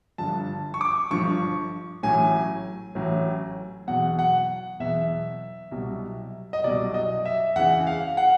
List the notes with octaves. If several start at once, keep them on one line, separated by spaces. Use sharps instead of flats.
G1 G2 D3 F3 A5
C#6
D6
G1 G2 D3 F3 C#6
A1 A2 F#3 G#5
A1 A2 F#3
E2 B2 F#3 F#5
F#5
E2 B2 F#3 E5
C2 B2 F#3
D#5
C2 B2 F#3 D5
D#5
E5
E2 C#3 E3 F#5
F5
F#5